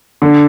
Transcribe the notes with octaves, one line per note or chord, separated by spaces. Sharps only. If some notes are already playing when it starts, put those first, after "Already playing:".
D3